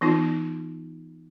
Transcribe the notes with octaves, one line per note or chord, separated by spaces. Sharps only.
E3 B3 D#4 F4